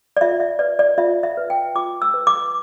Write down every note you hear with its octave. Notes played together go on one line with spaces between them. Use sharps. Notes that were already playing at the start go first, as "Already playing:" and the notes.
D5
F4 E5
E5
B4 D5
D5
F4 E5
E5
B4
G5
F4 D6
E6
B4
D6